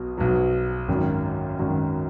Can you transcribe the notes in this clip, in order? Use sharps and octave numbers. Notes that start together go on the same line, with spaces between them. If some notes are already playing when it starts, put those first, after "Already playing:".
Already playing: B1 B2
B1 B2 F#3
G#1 F#2 D#3
G#1 F#2 D#3